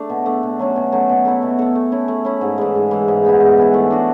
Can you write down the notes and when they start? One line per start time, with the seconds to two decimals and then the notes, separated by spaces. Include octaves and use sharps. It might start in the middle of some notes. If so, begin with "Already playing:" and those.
Already playing: A3 D4
0.10 B2
0.26 A3 D4
0.43 B2
0.59 F#3 A3 C#4
0.76 B2
0.92 F#3 A3 C#4
1.09 B2
1.25 A3 E4 A4
1.42 B2
1.59 A3 E4 A4
1.75 A3
1.92 C#4 E4
2.08 A3
2.25 C#4 E4
2.41 G#2
2.58 E3 G#3
2.75 G#2
2.91 E3 G#3
3.08 G#2
3.24 E3 B3 E4
3.40 G#2
3.57 E3 B3 E4
3.74 A3
3.91 D4 F#4